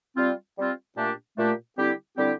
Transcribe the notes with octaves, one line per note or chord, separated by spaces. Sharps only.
G3 C4 F4
G3 C4 F4
A#2 A3 D4 G4
A#2 A3 D4 G4
D3 G3 C4 E4 G4
D3 G3 C4 E4 G4